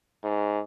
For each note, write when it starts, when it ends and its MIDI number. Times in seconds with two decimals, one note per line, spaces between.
0.23 0.60 44